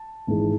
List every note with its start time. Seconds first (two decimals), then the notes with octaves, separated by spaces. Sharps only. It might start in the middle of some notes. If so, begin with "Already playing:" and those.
Already playing: A5
0.27 G#1 G#2 E3 G#3